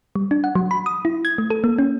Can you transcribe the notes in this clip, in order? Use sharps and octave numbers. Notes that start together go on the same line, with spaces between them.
G3
D4
F#5
F#3
B5
D#6
E4
G#6
A3
A4
A#3
C#4